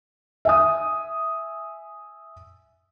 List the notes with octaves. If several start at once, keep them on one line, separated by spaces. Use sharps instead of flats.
E5 G#5 D#6